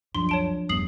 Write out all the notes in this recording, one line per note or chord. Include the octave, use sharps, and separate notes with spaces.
C#2 F#2 F3 D4 C6
C#5 A5 D7
E1 G2 G3 B3 D#6 C7 F#7